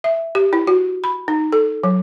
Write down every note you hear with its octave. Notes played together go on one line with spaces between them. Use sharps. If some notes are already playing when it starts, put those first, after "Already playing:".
E5
G4
E4
F#4
B5
D#4
A4
F#3